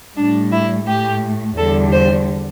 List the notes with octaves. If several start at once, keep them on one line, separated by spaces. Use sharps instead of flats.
A2 G3 D4
E4
A2 A3 G4
E2 D3 G3 A4
C5